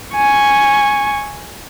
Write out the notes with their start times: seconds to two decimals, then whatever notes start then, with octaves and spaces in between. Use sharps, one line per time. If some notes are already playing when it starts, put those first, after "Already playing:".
0.16 G#5 C#6